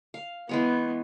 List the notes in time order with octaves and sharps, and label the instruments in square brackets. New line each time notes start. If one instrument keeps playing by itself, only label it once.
[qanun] F5
[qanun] E3 G#3 C#5 [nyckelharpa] B3